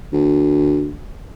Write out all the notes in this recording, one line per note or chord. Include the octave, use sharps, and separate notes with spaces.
D2